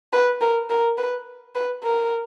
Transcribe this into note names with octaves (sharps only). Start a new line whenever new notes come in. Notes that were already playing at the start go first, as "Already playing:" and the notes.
B4
A#4
A#4
B4
B4
A#4